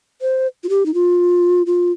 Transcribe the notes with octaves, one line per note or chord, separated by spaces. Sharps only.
C5
F4
G4
D#4
F4
F4